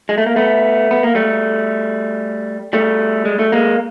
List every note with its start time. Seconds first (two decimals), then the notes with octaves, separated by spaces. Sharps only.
0.09 G#3
0.18 A3
0.26 A#3
0.36 A3 B3
0.91 B3
1.03 A#3
1.15 G3 A3
2.73 G3 A3
3.25 G#3
3.39 A3
3.52 G#3 A#3